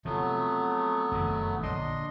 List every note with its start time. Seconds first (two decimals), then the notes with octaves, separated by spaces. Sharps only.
0.05 C3 F3 F#3 A3 B3
1.12 F1 F#2 D#3
1.63 A#1 D3 D4 D#5 C6